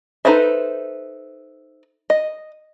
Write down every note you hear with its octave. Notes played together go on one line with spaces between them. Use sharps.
D#4 A4 B4 C5 E5
D#5